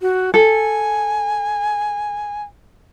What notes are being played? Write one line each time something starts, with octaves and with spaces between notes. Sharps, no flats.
F#4
A4 G#5